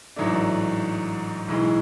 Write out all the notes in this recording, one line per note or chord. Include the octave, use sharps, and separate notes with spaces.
A1 G#2 F#3 A3 D4
B1 A2 E3 G#3